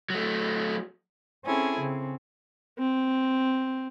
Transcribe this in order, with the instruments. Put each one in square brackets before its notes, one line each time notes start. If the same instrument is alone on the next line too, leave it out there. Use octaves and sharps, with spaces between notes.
[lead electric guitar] F#3 A3
[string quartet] C4 C#4 E4 G#4 A4
C#3 C4
[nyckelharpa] C4